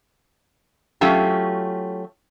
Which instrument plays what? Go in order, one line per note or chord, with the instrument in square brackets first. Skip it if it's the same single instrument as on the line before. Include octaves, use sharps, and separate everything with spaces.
[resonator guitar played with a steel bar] F#3 A3 C#4 F4 G4